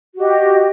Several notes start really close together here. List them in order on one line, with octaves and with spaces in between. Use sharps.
F#4 G4 D#5